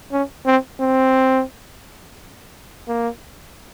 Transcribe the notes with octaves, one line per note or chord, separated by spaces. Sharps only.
C#4
C4
C4
A#3